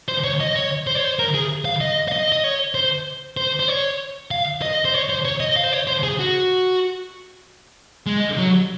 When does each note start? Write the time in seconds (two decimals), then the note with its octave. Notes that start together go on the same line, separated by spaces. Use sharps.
0.08 C5
0.24 C#5
0.40 D#5
0.56 C#5
0.87 C5
0.95 C#5
1.04 C5
1.19 A#4
1.34 G#4
1.65 F5
1.81 D#5
2.08 F5
2.12 D#5
2.32 D#5
2.44 C#5
2.75 C5
3.37 C5
3.60 C5
3.68 C#5
4.31 F5
4.62 D#5
4.85 C5
4.94 C#5
5.09 C5
5.25 C#5
5.40 D#5
5.56 F5
5.64 C5
5.72 C#5
5.87 C5
6.03 G#4
6.19 F#4
8.06 G#3
8.37 F#3